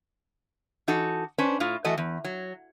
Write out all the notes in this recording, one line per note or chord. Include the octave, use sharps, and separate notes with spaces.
E3 D#4 F#4 A4
C#4 D4 B4 C5
A2 F4
E3 A3 F#4 D#5
E2
F#3